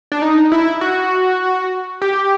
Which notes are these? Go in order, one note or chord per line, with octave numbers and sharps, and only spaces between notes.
D4
D#4
E4
F#4
G4